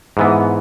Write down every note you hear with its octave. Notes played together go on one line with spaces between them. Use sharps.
G#2 E3 B3